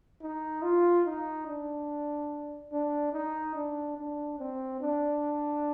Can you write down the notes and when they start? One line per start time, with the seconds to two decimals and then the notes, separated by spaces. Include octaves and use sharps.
0.22 D#4
0.62 F4
1.05 D#4
1.47 D4
2.72 D4
3.13 D#4
3.55 D4
3.97 D4
4.39 C4
4.81 D4